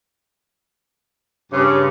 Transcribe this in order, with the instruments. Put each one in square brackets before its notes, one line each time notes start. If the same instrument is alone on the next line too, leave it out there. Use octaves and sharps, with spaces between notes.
[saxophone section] G2 C#3 [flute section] C6 D6